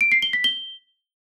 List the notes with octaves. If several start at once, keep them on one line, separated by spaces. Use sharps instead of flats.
D7
C7
G7
B6
G7